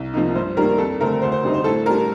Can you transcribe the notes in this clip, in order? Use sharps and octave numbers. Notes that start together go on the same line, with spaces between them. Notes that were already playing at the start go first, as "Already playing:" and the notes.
Already playing: C2
C3 F3 A#3 D#4
G2 C5
D#3 G3 A#3 A#4
F2 A4
D3 A3 C4 A#4
D2 C5
C5
D3 G3 C4 D#4
C5
A2 A4
G3 D4 A#4